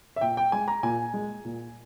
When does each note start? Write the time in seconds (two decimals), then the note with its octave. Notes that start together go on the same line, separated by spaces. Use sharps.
0.16 E5
0.21 A#2 G5
0.37 G5
0.52 G#3 G#5
0.68 A#5
0.83 A#2 G#5
1.14 G#3
1.45 A#2